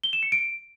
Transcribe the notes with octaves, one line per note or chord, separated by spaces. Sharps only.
G7
E7
C#7
D7